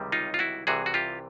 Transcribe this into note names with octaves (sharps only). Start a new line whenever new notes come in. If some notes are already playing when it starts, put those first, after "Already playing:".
Already playing: C#2 C3 D#3 G3
D#4 F4
F4
E4 F#4
C2 C3 E3 F#4 G#4
F#4
F4 G4